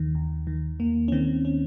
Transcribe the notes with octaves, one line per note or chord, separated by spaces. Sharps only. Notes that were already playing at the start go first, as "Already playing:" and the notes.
Already playing: D#2 D#3
D#2
D#3
D#2 A#3
C#4
D#3 C4
C#4